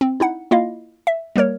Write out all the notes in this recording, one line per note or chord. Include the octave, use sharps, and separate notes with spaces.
C4
D#4 E4 F#5
A#3 E4 F4 D#5 F5
E5
G3 A#3 A#4 C#5